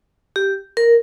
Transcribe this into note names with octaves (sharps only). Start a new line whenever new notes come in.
G4
A#4